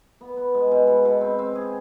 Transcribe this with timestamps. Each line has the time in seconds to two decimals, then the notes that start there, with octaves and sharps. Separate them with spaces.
0.21 B3
0.37 B3
0.55 G#3
0.71 B2
0.87 B2
1.05 B2
1.21 C4
1.39 C4
1.55 G#4